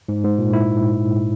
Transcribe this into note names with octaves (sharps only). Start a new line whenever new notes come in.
G#2
G#2
A#2
E4